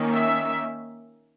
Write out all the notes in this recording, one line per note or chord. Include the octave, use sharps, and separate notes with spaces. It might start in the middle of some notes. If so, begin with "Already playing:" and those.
Already playing: D#3 A#3 C#4
E5